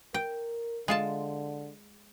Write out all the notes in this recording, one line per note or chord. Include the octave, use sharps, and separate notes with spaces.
A#4 G5
D3 G#3 F4 A5